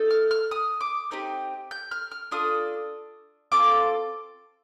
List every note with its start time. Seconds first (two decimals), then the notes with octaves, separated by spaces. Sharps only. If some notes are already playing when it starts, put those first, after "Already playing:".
Already playing: A3 D#4 A4
0.10 F6
0.31 F6
0.51 D#6
0.81 D6
1.11 C4 D#4 G4
1.71 G6
1.91 F6
2.11 F6
2.31 D4 F4 A4 D#6
3.52 C4 F4 A4 D6